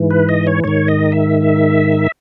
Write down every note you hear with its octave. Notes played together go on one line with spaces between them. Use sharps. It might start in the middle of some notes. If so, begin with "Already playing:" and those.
Already playing: G#2 E3
B4
D#5
C#5
G#2 D#3 C#5
D#5
E5